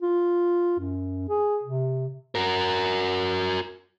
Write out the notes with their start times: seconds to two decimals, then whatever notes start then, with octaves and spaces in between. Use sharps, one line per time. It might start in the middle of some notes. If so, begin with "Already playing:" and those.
0.02 F4
0.79 F#2
1.29 G#4
1.63 C3
2.35 F#4 A#4